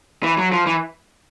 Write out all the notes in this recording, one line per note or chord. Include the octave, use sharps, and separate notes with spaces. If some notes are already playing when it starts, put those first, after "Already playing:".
E3
F#3
F3
E3